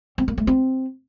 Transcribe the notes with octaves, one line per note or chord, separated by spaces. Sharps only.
C4
A#3
A3
C4